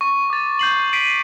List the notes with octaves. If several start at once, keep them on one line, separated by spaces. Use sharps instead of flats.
C#6
D6 A6
G6 C7 F#7
B6 C7 D7 D#7